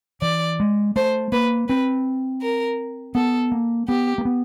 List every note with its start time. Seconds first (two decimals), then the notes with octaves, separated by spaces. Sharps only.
0.22 E3 D5
0.60 G#3
0.96 A3 C5
1.32 A#3 B4
1.68 C4 B4
2.42 A#4
3.15 B3 A4
3.52 A#3
3.88 B3 G4
4.18 A#3
4.25 B3